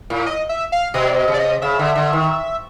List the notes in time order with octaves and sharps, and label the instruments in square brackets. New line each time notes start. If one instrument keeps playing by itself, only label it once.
[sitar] A2
[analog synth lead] D#5
E5
F5
[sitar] B2 [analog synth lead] D#5
[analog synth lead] D5
D#5
[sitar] C3
[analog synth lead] D5
D#5
[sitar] C#3 [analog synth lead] E5
[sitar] D3
D3
D#3